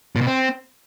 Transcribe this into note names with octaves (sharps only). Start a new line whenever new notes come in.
A#2
B2
C4